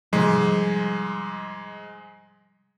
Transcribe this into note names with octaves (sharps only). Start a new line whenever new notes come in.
G#2 C3 F3 G3 G#3